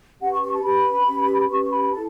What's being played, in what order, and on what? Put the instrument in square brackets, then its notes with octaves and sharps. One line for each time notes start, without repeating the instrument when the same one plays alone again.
[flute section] C#4 G4 B4 F#5
C#6
C#6
A5
C#4 G4 B4 B5
C#4 G4 B4
C#4 G4 B4 C#6
C#6
B5
B5
E4 A4 A5